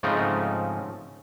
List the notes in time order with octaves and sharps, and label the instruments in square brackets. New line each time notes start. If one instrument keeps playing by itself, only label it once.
[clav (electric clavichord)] G#2 C#3 F3 A3 C4 D#4